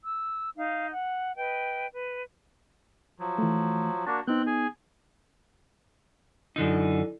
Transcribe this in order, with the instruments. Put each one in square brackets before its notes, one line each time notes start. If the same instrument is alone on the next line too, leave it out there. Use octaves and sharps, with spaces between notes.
[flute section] E6
D#4 F5
F#5
B4 D#5 G5
B4
[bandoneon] F3 F#3
[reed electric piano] E3 A3
[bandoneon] A#3 D4 F#4 [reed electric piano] A5
[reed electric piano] B3 D#4 [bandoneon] C4 F#6 G6
[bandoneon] G#4 G#5
[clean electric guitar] F#2 D3 D#4 [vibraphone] E4 A4 D5